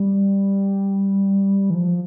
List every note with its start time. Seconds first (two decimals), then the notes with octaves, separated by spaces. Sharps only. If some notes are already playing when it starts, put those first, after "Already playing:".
Already playing: G3
1.70 E3
1.75 F3